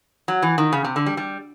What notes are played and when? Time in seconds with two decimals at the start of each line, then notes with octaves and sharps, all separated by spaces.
0.28 F#3
0.42 E3
0.58 D#3
0.73 C#3
0.84 C3
0.96 D3
1.06 G3
1.17 G3